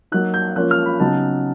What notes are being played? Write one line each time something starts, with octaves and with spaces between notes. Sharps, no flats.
F#3 A#3 D#4 F#6
G6
F3 A#3 C#4 F4 F#6
F6
B5
C#3 F#3 B3 D#4 A5